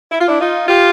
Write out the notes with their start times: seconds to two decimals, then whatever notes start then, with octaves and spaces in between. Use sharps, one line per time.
0.12 E4
0.20 F4
0.28 D4 E4
0.40 D#4 F4
0.68 F4 G4